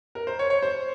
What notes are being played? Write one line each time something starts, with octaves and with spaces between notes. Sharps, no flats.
A#4
C5
C#5
C#5
C5